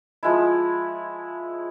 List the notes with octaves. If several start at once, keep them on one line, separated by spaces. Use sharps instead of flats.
F3 G#3 E4